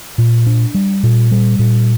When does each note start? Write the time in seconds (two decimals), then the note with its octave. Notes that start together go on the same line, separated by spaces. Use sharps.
0.18 A#2
0.46 D4
0.74 G3
1.03 A#2
1.31 G3
1.59 A#2